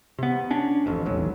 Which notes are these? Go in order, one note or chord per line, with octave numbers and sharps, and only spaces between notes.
C3 B3
C#4 D4
D1 A1 F2
E1 A1 D#2 F#3